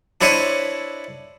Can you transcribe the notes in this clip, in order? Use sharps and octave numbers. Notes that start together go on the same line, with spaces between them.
D4 E4 C5 C#5 D#5 E5